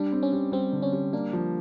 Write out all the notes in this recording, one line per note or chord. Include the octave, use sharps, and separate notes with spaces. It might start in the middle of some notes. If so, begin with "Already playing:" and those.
Already playing: G3 D4
C4
C#4
G3
G3 C4
D3
C#4
G3
A#3 D4
F3